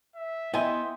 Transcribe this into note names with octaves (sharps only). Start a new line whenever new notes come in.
E5
B3 E4 D#5 E5 G5 G#5 C6